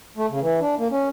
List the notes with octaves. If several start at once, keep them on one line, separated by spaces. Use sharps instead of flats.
A3
C#3
E3
D4
A#3
C#4